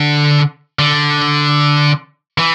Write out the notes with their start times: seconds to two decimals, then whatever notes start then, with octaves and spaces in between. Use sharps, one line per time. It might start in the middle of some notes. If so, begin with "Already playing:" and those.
Already playing: D3
0.79 D3
2.38 E3